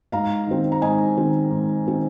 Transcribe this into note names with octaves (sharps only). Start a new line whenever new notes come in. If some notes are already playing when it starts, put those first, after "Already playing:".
G#2 F5 A#5
D#3 C4
A#5
G#2 D#5 G#5
D#3 C4
G#2
D#3 C4